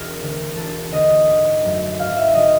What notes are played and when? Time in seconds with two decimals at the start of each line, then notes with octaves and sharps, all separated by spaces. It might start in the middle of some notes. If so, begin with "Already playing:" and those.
Already playing: E1 A#4
0.21 D2 D3
0.56 E1 A4
0.92 D2 D3 D#5
1.27 G#1
1.63 F#2 D3 F#3 A3
1.99 G#1 F5
2.17 E5
2.34 D3 F#3 A3 D#5